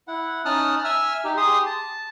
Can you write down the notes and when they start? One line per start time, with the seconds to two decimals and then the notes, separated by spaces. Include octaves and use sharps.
0.08 E4 F#5
0.45 C#4 D#4 A5 D#6 F6 F#6
0.85 E5 G#5 E6 F6
1.24 D#4 G4
1.37 G4 G#4 C6 D#6
1.66 A5